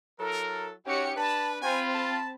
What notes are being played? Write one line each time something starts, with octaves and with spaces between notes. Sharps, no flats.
F#3 E4 A4 A#4
C#4 D#4 F#4 G4 C#5 C#7
D4 B4 A5 B5
C4 F4 G5 G#5 B5
A5